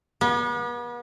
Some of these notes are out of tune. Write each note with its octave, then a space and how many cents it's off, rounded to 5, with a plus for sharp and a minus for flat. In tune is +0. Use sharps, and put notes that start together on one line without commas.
B3 -40